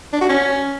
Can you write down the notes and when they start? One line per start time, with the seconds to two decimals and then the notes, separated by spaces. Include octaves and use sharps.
0.13 D4
0.21 F#4
0.29 C#4